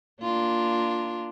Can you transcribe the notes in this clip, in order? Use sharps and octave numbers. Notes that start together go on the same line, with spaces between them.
A#3 D4 F4